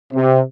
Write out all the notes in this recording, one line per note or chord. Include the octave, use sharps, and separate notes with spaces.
C3